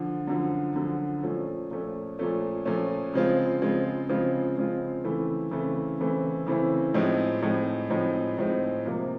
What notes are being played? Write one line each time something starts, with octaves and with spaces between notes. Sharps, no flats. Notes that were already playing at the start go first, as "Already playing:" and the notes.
Already playing: D3 F3
F#2 D3 F3
F#2 D3 F3
A#2 F3 A3 C#4
A#2 F3 A3 C#4
A#2 F3 A3 C#4
A#2 F3 A3 C#4
C#3 F3 G#3 C4 F4
C#3 F3 G#3 C4 F4
C#3 F3 G#3 C4 F4
C#3 F3 G#3 C4 F4
C#3 E3 A3 C4 E4
C#3 E3 A3 C4 E4
C#3 E3 A3 C4 E4
C#3 E3 A3 C4 E4
A2 F3 G#3 C4 D#4
A2 F3 G#3 C4 D#4
A2 F3 G#3 C4 D#4
A2 F3 G#3 C4 D#4
C3 F3 A#3